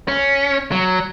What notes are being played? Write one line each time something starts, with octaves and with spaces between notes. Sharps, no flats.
C#4
F#3